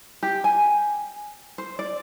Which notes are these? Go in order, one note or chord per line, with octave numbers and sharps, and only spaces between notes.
G4
G#5
C5
D5